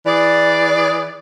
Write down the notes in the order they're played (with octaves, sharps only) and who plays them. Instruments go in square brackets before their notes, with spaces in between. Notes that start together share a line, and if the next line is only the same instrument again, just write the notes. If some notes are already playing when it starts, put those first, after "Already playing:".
[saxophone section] E3 G#4 D5